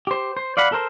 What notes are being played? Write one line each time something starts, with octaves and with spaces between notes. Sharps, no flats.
G4 C5
C5
D5 F5 F#5 B5
A4 A#4 C5